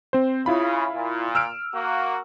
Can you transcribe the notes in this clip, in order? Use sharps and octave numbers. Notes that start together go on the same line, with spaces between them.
C4 C5
C#3 E4 F4 B5
A#2
E6 F6 D7
A#3 F#4